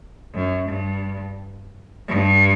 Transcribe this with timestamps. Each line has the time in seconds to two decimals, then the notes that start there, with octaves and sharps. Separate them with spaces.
0.35 F#2
0.69 G2
2.08 G2